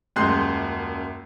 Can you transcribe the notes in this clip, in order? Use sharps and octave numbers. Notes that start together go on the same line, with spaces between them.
D#1 F#2 G#3 C6 F#6 G6